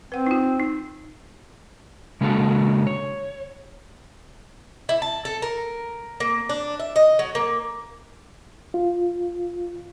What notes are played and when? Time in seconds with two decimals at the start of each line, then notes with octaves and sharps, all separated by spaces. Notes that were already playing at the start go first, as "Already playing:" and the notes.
0.12 C4 B4 F#5
0.27 D#4 F4
0.59 D#4
2.21 C#3 G#3 A#3 D4 F#4 A4
2.87 C#5
4.89 E4
5.02 A5
5.25 A4
5.42 A#4
6.20 A#3
6.49 D4
6.80 E5
6.96 D#5
7.19 F#3
7.35 A#3
8.74 F4